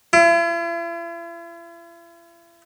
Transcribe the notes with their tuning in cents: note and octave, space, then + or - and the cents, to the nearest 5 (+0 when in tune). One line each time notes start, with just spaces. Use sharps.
E4 +45